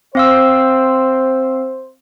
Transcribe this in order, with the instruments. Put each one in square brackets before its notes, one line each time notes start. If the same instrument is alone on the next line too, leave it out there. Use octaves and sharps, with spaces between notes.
[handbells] C4 F5 E6 [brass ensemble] C5